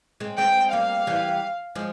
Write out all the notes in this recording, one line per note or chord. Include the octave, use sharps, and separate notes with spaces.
G#3 C4
G#3 C4 G5
G3 A#3 F5
E3 G3
F3 G#3